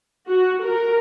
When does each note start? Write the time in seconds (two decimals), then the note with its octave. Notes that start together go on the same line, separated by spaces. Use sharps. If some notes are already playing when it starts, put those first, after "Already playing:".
0.27 F#4
0.62 A#4